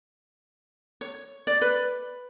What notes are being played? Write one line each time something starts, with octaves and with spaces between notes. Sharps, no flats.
C#5
D5
B4